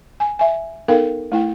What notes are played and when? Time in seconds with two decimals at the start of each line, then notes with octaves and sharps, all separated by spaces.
0.20 G#5
0.39 E5 G#5
0.88 B3 D#4 A4 A#4 F5 G5
1.32 A3 E4 G5